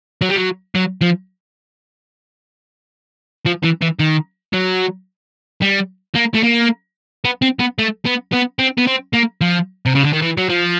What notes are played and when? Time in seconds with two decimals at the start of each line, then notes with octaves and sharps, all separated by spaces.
0.21 F#3
0.29 G3
0.36 F#3
0.75 F#3
1.01 F3
3.46 F3
3.63 E3
3.81 E3
3.99 D#3
4.53 F#3
5.62 G3
6.16 A#3
6.35 A3
6.44 A#3
7.25 B3
7.42 C4
7.60 B3
7.78 A3
8.05 B3
8.32 B3
8.59 C4
8.78 B3
8.86 C4
9.13 A#3
9.41 F3
9.86 C3
9.95 C#3
10.04 D3
10.13 D#3
10.22 E3
10.37 F#3
10.49 F3